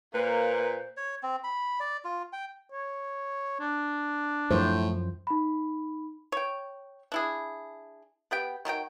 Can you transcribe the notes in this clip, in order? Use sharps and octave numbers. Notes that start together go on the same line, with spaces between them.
A#2 A#3 B4 C5
C#5
C4
B5
D5
F4
G5
C#5
D4
F#2 A2 F3 C5
D#4 B5
C#5 G5
D4 E4 G#4
B3 G4 G5
D#3 F#3 G#4 G5